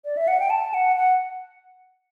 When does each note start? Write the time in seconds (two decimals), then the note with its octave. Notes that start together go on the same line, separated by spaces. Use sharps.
0.05 D5
0.17 E5
0.28 F#5
0.40 G5
0.50 A5
0.74 F#5
0.96 F#5